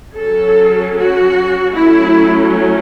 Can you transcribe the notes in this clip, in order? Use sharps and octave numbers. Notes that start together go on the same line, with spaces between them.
F#3 C#4 A4
F#4
F#3 A3 C#4 E4